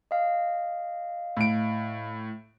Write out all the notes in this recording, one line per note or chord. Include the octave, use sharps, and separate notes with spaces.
D#5 F5
A2 D7